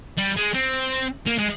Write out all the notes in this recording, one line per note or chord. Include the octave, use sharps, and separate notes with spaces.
G3
G#3
C4
A#3
G#3